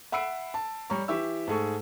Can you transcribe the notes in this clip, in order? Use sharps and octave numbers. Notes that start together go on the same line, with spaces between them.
E5 F#5 B5 E6 C7 D7
A5
G3 C#5 A#5 C#6
E3 G4 E5 C#6 E6
G#2 A3 G#4 A4 C#6